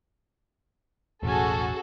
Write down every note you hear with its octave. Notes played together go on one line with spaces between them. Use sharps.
E1 A1 C#4 F#4 G#4 A4 G#5